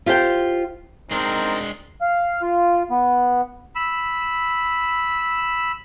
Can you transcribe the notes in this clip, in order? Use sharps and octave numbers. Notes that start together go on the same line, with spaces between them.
F4 G4 C5 G5
G#3 C4 D4 D#4 A#4
F5
F4
B3
B5 E6